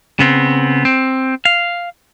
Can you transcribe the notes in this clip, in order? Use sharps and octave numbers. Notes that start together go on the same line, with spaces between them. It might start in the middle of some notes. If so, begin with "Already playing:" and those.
C#3 B3 C4
C4
F5